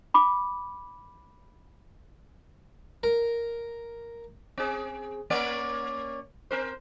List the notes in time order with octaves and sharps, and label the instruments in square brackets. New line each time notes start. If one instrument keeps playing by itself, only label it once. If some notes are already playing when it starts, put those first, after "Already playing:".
[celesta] B5 D6
[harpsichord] A#4
[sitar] C4 G#4
A#3 C#4 D5
C4 A#4 C5